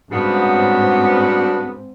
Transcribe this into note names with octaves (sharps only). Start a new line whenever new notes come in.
G#2 C#3 G3 B3 C4 D4 F#4